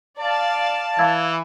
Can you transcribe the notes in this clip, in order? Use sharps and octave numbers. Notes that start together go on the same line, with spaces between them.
D5 F5 A5
E3 F5 E6 G#6